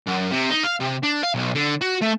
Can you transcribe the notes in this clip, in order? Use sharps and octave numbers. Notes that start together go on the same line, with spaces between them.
F#2
C3
D#4
F5
C3
D4
F5
B1
D3
F#4
A3